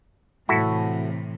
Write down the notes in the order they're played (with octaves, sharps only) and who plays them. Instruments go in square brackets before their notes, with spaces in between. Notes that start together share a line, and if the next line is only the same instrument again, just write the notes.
[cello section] A2 C3 E3 [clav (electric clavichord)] E4 F#4 A4